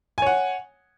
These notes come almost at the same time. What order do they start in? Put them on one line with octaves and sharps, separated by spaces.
G#5 C#5 F#5